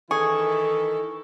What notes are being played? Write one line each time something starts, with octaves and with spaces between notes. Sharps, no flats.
D#3 E3 E4 G#4 A4 C#6